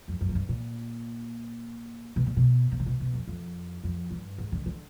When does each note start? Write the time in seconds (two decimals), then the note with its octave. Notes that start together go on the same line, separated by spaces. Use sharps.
0.08 F2
0.21 F#2
0.29 G#2
0.35 G2
0.49 A#2
2.16 B2
2.27 A#2
2.37 B2
2.72 A#2
2.80 C3
2.86 B2
3.00 B2
3.14 F2
3.28 F2
3.84 F2
4.11 G2
4.38 G#2
4.52 D3
4.66 D3